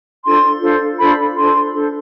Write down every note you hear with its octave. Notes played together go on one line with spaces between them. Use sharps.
D4 F4 A4 C5 C6
D4 F4 A4 C5
D4 F4 A4 C5 B5
D4 F4 A4 C5 C6
D4 A4 C5